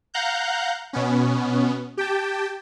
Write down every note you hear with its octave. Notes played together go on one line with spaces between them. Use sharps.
F5 F#5 A#5 F#6 G6
B2 B3 C#4
G4 G5 A5